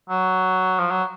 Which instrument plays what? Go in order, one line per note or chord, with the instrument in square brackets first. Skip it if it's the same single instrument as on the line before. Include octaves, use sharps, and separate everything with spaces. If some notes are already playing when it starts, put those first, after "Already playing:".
[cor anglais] F#3
F3
F#3